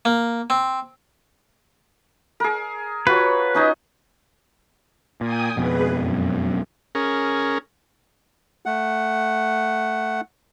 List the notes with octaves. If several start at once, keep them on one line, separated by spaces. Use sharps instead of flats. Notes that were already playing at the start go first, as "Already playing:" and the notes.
A#3
C4
G#4 A#4
F4 F#4 B4 C#5
C#4 D#4 D#5
A#2 G5 G#5 D#6
F2 B2 G#4 B4
F#2
C#4 G#4 A#4
A3 F#5